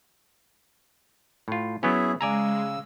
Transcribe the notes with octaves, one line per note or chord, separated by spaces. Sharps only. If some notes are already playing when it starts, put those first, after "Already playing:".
A2 F4
F#3 B3 C#4 E4 G#4 E5
C#3 G#3 D5 G#5 A#5 E6